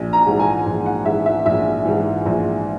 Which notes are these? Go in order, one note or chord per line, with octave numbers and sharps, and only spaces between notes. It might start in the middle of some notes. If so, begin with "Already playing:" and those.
Already playing: A#1
A#5
G#2 E3
G#5
A#1
F#5
G#2 E3 E5
E5
A#1 E5
G#2 E3
A#1